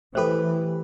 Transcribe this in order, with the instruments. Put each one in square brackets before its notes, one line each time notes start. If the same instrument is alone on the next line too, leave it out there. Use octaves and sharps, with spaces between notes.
[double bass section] E3 [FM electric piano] A3 G4 B4 [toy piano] A4 C5